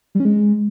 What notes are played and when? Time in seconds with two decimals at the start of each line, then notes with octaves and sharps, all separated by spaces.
0.15 G3
0.20 C#4
0.25 G#3